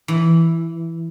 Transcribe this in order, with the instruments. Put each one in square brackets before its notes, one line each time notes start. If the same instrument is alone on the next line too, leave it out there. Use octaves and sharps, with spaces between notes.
[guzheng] E3